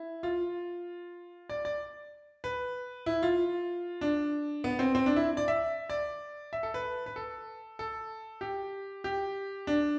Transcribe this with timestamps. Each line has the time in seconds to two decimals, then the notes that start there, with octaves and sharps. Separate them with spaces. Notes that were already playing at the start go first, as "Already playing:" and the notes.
Already playing: E4
0.23 F4
1.49 D5
1.65 D5
2.44 B4
3.06 E4
3.23 F4
4.01 D4
4.64 B3
4.79 C4
4.95 C4
5.06 D4
5.16 E4
5.37 D5
5.48 E5
5.90 D5
6.53 E5
6.63 A4
6.74 B4
7.06 B4
7.16 A4
7.79 A4
8.41 G4
9.04 G4
9.67 D4